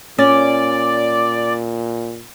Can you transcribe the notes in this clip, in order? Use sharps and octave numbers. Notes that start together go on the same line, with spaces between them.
A#2 C#4 D5